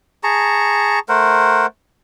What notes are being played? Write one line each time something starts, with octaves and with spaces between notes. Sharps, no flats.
G#4 A5 A#5 C#6
A3 A#4 C5 F#5